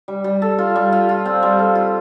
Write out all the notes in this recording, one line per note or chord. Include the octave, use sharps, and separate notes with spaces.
G3
G3
A4
F4
G3
F4
F4
C4
G3
A4
F4